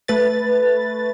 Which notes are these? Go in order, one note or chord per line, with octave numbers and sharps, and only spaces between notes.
A3 B4 A6